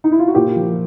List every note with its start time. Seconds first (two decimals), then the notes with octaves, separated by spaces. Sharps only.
0.04 D#4
0.12 E4
0.19 F4
0.28 F#4
0.35 A#2 G4
0.56 F3